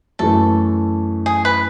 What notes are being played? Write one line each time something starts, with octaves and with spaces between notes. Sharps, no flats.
F#2 E3 A3 A4
G#4
B4